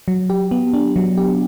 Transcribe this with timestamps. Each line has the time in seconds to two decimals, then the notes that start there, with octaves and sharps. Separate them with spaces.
0.08 F#3
0.30 G4
0.51 B3
0.74 D4
0.96 F#3
1.17 G4